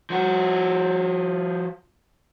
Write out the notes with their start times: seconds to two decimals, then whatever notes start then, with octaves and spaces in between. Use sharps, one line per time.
0.10 F3 F#4